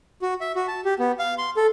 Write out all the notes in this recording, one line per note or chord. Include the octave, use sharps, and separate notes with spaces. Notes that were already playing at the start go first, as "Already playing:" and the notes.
F#4
E5
F#4
A5
G4
B3
F5
C6
A4